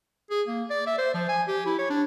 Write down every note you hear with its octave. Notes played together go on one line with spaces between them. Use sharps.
G#4
A#3
D5
E5
C5
F3
G#5
G4
E4
C#5
D4